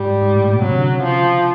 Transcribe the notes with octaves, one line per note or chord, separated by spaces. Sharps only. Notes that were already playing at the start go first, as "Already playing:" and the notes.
Already playing: G#2 G3
G#2
A2
A#2
C3 F#3
D3
C#3
C#3 F3